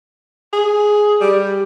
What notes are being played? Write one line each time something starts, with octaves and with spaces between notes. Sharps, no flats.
G#4
G3